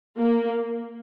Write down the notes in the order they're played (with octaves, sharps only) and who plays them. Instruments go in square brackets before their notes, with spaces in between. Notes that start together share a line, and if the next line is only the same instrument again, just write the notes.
[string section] A#3